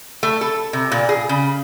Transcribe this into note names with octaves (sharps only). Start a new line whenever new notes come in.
A3
A4
C3
A#2
G#4
C#3